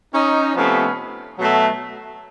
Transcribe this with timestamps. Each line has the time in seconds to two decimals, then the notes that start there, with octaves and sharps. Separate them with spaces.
0.12 C#4 D#4
0.54 C3 F3 A3 B3 C#4
1.38 B2 F#3 A3